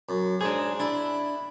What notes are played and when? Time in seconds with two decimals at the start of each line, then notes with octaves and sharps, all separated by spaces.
0.09 F#2
0.41 G#2 D4 G#4
0.80 D4 E4